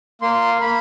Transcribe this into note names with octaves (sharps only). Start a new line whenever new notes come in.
A#3 C6
A#3 B5